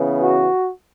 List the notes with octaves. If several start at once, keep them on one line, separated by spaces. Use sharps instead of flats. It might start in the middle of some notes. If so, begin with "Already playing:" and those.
Already playing: C#3 E3 B3
F#4